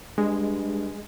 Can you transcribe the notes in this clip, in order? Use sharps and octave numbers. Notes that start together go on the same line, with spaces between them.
G2 G#3